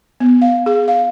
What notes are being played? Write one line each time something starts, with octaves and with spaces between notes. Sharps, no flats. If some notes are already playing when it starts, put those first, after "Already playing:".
B3
F5
G#4
F5